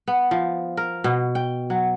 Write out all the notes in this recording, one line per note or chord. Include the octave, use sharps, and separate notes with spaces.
B3
F3
A#4
B2
G5
F#3